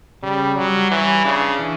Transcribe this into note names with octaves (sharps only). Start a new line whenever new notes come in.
C#3 G3
F#3 G3
E3 C#5
C#3 D4
E3